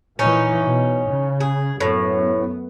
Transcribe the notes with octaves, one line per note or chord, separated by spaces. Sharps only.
A#2 E3 C#4 D#4
B2
C#3
G#4
F#2 A2 B3